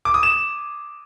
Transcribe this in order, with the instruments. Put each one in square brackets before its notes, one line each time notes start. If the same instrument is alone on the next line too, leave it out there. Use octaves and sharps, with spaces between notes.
[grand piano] D6
D#6
E7